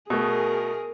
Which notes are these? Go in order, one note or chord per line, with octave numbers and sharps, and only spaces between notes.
B2 A3 G#4 A#4